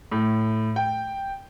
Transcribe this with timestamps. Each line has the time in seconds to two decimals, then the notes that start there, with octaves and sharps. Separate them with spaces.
0.12 A2
0.76 G5